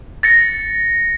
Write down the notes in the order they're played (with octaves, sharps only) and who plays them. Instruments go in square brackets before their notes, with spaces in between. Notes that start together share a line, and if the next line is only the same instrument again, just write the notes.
[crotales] A6 A#6 C#7